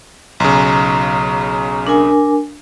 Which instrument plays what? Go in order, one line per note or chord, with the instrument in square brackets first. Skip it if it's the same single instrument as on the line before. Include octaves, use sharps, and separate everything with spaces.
[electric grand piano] B1 C#3 [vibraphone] A#5
[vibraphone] D4 A#4 G#5